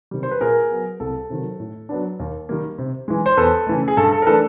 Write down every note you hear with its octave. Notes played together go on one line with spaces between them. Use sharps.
C3 D#3 G3
C5
B4
A#2 G#4 A#4
F#3 B3
C2 A4
C3 D#3 F#3
A2
F#3 B3 D4
D#2
D#3 G3 A#3
C3
E3 G#3
C5
E2 A4 B4
C#3 E3 A3
G#4
G2 A4
A4
A#4
E3 A3 D4 A4 B4